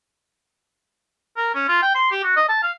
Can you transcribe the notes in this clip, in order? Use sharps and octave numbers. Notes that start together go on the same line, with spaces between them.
A#4
C#4
F4
G5
C6
G4
F#4
D#5
A5
F5